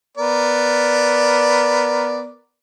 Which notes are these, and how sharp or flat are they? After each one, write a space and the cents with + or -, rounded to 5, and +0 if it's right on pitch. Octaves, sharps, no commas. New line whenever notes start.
B3 +0 A#4 +0 D5 +0